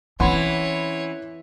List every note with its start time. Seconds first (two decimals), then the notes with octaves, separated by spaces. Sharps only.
0.20 E3 C4 C#4 C#5 F#5 B5 C6